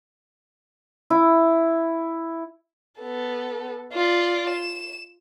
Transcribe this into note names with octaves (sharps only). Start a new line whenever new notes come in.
E4
B3 A4
F4 D5
E7